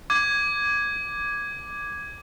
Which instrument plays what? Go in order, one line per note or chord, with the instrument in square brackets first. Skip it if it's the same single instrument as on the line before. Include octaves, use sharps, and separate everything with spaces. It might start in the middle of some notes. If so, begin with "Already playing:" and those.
[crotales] D6 G#6